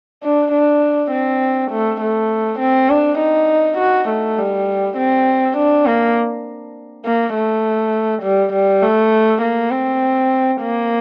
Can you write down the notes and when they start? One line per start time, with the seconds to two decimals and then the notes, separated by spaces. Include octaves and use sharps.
0.23 D4
0.52 D4
1.11 C4
1.71 A3
2.01 A3
2.59 C4
2.90 D4
3.19 D#4
3.78 F#4
4.09 A3
4.38 G3
4.98 C4
5.57 D4
5.86 A#3
7.05 A#3
7.34 A3
8.23 G3
8.53 G3
8.83 A3
9.42 A#3
9.71 C4
10.61 A#3